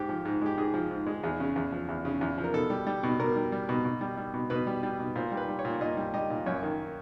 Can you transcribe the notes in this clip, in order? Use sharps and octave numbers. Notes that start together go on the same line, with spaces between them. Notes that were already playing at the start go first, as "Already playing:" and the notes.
Already playing: G#2 G4
F3
G#2
G#3 G4
G#2 G#4
F3
G#2
G#3
E2 G#4
C#3
E2
F3
E2
C#3
E2
F3
A#4
B2 A4
G3
G3
B2
B2 A#4
G3
G3
B2
B2
G3
G3
B2
B2 B4
G3
G3
B2
A#2 C5
G3
B4
G3
C#5
A#2
A#2 D#5
G3
G3 D#5
A#2
F#2 C#5
D#3